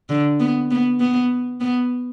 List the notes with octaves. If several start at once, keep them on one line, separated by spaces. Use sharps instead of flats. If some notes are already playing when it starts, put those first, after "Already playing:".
D3
B3
B3
B3
B3